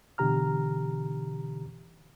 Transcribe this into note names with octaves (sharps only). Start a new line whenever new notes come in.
B2 D3 E3 G4 A#5 F6